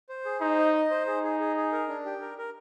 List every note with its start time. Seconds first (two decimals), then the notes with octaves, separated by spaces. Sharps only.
0.09 C5
0.25 G#4
0.41 D#4 C5
0.58 D#5
0.74 D#5
0.91 C5
1.07 D#4 G#4
1.23 G#4
1.40 G#4
1.56 G#4
1.72 A#4
1.89 D4
2.05 G4
2.21 A#4
2.38 A#4